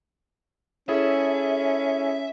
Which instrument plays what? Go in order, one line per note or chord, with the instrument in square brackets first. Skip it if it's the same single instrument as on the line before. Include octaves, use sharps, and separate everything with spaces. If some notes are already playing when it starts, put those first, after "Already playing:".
[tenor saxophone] C#4 [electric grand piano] E4 G#4 A4 [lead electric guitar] E5